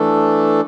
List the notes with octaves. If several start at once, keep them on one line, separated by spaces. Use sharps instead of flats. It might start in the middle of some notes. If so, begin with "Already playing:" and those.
Already playing: E3 A3 D4 A4